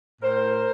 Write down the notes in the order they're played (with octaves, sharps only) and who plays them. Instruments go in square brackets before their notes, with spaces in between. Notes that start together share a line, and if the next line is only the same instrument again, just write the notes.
[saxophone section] A2 A#4 C5